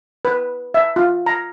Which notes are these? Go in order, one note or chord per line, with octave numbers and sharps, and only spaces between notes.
B4
E5
F4
A#5